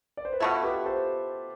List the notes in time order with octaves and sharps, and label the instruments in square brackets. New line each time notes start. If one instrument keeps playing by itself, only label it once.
[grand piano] D5
C5
B4
[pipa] B2 A3 E4 [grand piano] F4 A4
[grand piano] G4 B4
A4 C5